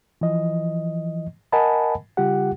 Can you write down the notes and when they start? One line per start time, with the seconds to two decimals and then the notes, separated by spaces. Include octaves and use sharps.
0.21 E3 F3 D#5
1.52 A#4 D#5 F#5 G#5 A5 B5
2.17 C#3 G3 F4 G4 F#5